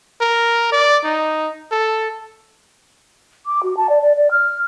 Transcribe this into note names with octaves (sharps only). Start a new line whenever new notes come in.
A#4
D5
D#4
A4
D6
F#4
A5
D5
D5
D5
F6